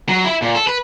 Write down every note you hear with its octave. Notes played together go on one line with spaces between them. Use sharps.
F#3
E4 E5
A#2
A4
B4